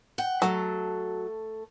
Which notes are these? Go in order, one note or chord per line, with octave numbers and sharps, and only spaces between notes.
F#5 G5
F#3 A3 A4